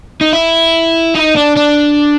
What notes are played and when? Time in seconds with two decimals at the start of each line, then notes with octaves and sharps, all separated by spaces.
0.21 D#4
0.33 E4
1.15 D#4
1.36 D4
1.56 D4